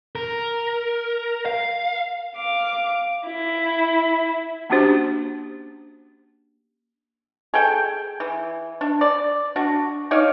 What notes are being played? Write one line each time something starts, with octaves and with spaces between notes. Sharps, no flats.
A#4
F5
F5 D6
E4
A#3 C#4 D4 F#4 G4 C5
G#4 A4 G5
E3
D4
D5
D4 F#4
D#4 C#5 D5 F5